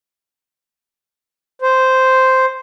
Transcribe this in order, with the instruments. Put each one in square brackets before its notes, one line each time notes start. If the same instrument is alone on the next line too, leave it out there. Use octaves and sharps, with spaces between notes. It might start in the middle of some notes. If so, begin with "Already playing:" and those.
[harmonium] C5